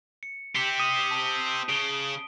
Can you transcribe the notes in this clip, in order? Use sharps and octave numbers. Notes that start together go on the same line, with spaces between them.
C#7
C4 G4 B6 C#7 G7
D#6 D#7
A5
C#3 D7 G7